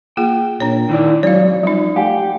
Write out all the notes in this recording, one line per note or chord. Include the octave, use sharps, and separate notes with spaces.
A#3 F4 G#4 G5
A#2 D4 C#5
A2 D#3 E4 D5
F2 G#2 F#3 C#5 D5 F5
F#2 F3 G3 D#4
A3 G4 F5 F#5 G#5